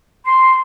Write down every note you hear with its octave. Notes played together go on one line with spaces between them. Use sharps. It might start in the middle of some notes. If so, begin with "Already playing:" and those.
C6